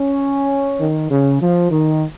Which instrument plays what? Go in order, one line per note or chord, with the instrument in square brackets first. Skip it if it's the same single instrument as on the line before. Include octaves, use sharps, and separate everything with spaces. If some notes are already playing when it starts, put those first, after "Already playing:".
Already playing: [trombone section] C#4
D#3
C#3
F3
D#3